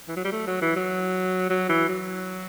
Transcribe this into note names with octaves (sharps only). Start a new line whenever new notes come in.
E3
F#3
G3
A3
F#3
E3
F#3
F#3
E3
F#3